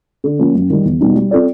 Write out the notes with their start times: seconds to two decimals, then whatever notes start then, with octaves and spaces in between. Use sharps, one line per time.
0.24 D3
0.39 F3 A#3 C#4
0.54 F#2
0.70 D#3 G3
0.85 E2
1.00 B2 G3 B3 D#4
1.16 G3
1.31 C4 F4 A4 D5